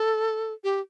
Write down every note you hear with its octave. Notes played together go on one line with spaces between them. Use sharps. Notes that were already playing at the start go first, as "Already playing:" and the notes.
Already playing: A4
G4